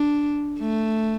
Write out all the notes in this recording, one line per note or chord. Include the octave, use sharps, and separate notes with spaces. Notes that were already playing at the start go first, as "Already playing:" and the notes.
Already playing: D4
A3